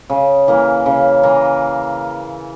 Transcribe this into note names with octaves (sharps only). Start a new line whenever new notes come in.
C#3
E3 A#3
C#3
E3 A#3